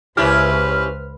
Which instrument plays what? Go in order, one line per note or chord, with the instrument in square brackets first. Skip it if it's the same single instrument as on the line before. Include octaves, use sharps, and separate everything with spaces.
[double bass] C#2 [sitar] C#4 E4 G4 [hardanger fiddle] B4 C5 [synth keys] F6